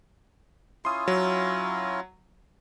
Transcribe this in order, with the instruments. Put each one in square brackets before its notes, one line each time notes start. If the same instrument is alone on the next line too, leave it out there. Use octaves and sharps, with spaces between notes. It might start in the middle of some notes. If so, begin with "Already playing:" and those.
[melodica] C#4 E4 F4 [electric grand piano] C6 D#6
[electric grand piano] F#3